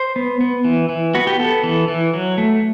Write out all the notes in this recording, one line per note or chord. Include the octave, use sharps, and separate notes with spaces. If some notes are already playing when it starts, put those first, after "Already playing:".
Already playing: C5
B3
B3
E3
E3
B3 F#4
G4
B3 A4
E3
E3
F#3
A3